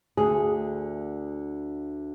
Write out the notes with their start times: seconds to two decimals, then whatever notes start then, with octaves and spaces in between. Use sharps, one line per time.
0.17 D2 D3 G#4